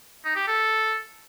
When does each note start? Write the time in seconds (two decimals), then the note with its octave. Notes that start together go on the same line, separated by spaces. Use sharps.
0.25 D#4
0.36 G4
0.47 A4